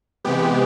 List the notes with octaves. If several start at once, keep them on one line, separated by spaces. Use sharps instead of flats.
C3 E3 G#3 B3 G4